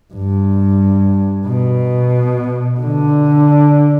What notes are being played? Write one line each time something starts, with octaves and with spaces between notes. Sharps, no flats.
G2
B2
D3